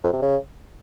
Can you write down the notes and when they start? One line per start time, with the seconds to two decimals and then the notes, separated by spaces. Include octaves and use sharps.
0.04 F2
0.13 C3
0.22 C#3